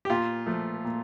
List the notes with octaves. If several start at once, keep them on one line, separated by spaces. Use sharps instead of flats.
G4
A#2 F4
F3 A3
A#2